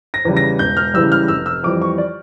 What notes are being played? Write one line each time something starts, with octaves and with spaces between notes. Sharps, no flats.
A#6
E2 C#3 E3 G3
A#6
E1 G6
F6
E2 C#3 E3 G3 E6
F6
F1 E6
E6
F2 E3 G3 D6
C#6
D5